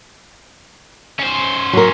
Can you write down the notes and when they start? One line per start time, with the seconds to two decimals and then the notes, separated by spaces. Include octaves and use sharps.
1.19 C#4 C5
1.73 F#3 A#4